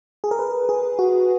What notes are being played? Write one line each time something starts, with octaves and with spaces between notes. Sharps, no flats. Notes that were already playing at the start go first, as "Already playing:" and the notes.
G#4
A#4
B4
G#4
F#4